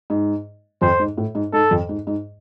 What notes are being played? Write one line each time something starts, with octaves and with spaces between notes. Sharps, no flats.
G#2
F2 C5
G#2
A2
G#2
G#2 A4
F2
G#2
G#2